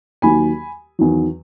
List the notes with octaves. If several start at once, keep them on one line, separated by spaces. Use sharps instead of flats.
D#2 D#3 F#3 G#5 B5
E2 D#3 F#3